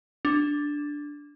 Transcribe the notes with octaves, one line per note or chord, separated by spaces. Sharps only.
D4